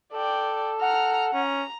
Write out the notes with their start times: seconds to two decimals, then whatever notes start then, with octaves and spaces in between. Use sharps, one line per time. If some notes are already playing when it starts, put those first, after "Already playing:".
0.13 A4 D5 G5
0.81 F#5 A#5 F6
1.34 C#4 A#5